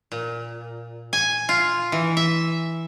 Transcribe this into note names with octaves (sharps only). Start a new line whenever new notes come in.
A#2
G#5
F4
E3
E5